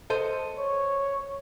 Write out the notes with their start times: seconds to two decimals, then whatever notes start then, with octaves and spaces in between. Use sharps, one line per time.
0.10 A4 C5 D#5
0.58 C#5